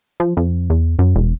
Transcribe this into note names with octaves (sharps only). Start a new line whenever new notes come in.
F3
F2
E2
F#2
E1